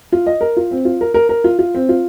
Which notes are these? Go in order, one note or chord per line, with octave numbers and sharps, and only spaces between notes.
F4
D#5
A#4
F4
C4
F4
A#4
A#4
A#4
F4
F4
C4
F4